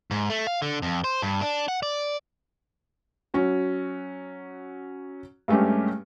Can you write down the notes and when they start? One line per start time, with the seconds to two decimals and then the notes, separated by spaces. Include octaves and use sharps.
0.11 G#2
0.30 A3
0.47 F5
0.62 D3
0.82 F2
1.04 C5
1.22 G2
1.42 D4
1.68 F#5
1.83 D5
3.34 F#3 C#4 F#4
5.48 G2 G#3 A3 C#4 G4